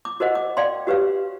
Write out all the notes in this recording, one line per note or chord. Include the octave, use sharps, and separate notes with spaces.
D6
F#4 A#4 C5 D#5 F#5
D6
D5 F5 G5 C6
F#4 G4 B4 C#5 F5